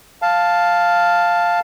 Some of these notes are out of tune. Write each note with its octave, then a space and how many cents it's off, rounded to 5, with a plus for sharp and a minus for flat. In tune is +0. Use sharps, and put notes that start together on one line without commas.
F5 +0 A5 +0